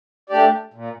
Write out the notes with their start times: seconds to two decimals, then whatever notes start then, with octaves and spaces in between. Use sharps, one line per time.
0.30 A3 D4 G4 D5
0.74 A#2